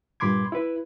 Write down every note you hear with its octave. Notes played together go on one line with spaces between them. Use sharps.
G2 A#2 B5 C6 D6 G#6
E4 B4